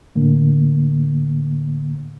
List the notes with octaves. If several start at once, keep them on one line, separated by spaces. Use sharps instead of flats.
A2 D3 A#3